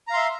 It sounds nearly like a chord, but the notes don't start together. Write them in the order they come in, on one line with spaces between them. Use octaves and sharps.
A#5 F5 C6 E5